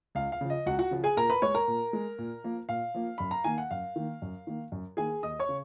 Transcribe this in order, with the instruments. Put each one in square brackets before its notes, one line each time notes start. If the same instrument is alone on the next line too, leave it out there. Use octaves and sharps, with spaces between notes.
[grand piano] C#2 F5
F5
C#3 F3
D#5
C#2 F#4 F#5
F#4 F#5
C#3 F3
G#4 G#5
A#2 A#4 A#5
B4 B5
G#3 C#5 C#6
A#4 A#5
A#2
G#3
A#2
F3 A#3
A#2 F5
F3 A#3
F#2 B5
A#5
D#3 A#3 G#5
F#5
F#2 F5
D#3 A#3
F#2
D#3 A#3
F#2
D#3 A#3 G#4 G#5
D#2 D#5 D#6
C#5 C#6
C#3